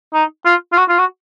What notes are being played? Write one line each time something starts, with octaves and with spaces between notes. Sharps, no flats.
D#4
F4
F4
F#4
F4
F#4